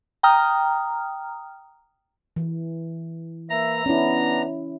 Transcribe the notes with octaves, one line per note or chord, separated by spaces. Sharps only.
G5 A#5 D#6 F6
E3
A#3 B4 E5 A#5
B3 C#4 D4 E4